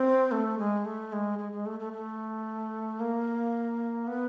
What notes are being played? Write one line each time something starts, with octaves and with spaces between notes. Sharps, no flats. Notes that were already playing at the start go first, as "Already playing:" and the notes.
Already playing: C4
A3
G#3
A3
G#3
G#3
G#3
A3
A3
A3
A#3
B3